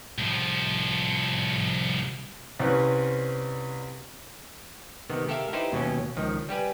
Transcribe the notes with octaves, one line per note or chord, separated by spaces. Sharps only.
C2 F3
C2 C4 C#4 B4
C3 D#3 B3
G4 A4 A#4 E5 F5
D#4 E4 G4 B4 C5
D#2 B2 F#3 C#4
C#2 D#3 F3
G3 G4 B4 G#5